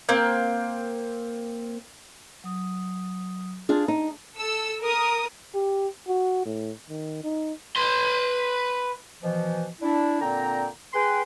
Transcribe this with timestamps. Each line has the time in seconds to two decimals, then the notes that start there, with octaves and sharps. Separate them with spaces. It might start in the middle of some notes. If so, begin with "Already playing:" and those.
0.09 A#3 C4
2.44 F#3 D#6
3.69 D4 F4 G#4
3.88 D#4
4.36 A4 E6
4.81 A#4 D#6
5.55 G4
6.08 F#4
6.46 A2
6.90 D#3
7.24 D#4
7.76 B4 C6
9.22 B2 E3 F3
9.81 D4 E4
10.21 A#2 D3 C4 G5 A#5
10.94 G#4 B4 G5 C6